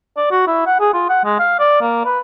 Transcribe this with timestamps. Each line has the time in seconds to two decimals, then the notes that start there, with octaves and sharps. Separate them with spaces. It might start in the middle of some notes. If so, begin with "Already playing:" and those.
0.17 D5
0.31 F#4
0.47 E4
0.67 F#5
0.80 G#4
0.94 F4
1.09 F#5
1.25 G#3
1.39 F5
1.60 D5
1.81 A#3
2.05 B4